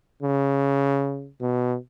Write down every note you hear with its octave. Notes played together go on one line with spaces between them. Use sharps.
C#3
B2